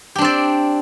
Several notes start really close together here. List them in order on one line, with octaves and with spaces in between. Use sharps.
G4 D4 C4 D5